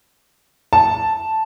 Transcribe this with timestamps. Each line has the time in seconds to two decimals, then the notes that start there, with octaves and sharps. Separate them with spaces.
0.73 A5